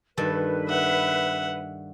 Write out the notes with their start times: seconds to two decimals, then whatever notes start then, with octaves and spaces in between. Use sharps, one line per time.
0.17 G2 D#3 A4 B4
0.68 E5 F#5